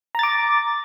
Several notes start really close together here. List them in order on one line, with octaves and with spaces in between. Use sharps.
A#5 A6 D6